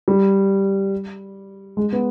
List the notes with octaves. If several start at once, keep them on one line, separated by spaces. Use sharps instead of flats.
G3
G#3
B3